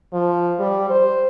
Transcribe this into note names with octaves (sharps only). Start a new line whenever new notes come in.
F3
G3
C5